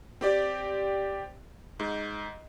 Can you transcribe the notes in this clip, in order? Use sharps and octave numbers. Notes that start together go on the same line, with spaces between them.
C4 G4 D5
G#2